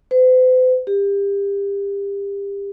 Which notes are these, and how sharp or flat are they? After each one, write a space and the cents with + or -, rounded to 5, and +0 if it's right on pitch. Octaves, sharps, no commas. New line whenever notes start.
C5 -45
G4 +30